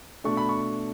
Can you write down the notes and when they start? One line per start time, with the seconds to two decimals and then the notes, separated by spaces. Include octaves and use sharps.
0.24 B2 A3 D4 C#6
0.37 B5
0.49 C#6